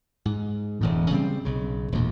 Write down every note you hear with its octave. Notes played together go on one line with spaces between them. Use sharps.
G#2
E1 E2 A2
C#3 G3 C4
B1 C#3
E1 D2 A#2